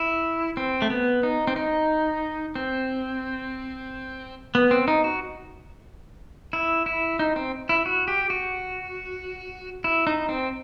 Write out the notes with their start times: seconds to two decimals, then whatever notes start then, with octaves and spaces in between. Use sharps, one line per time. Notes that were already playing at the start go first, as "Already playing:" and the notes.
Already playing: E4
0.57 C4
0.82 A3
0.90 B3
1.23 D#4
1.47 C4
1.56 D#4
2.55 C4
4.55 B3
4.71 C4
4.88 D#4
5.04 F#4
6.53 E4
6.86 E4
7.19 D#4
7.36 C4
7.69 E4
7.86 F#4
8.08 G4
8.30 F#4
9.84 E4
10.07 D#4
10.29 C4